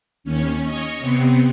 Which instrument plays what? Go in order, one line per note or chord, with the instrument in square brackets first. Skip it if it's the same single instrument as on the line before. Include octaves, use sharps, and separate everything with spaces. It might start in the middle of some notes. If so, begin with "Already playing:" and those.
[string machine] D#2 C#4
C#5 D#5 C#7
C3 B3 C4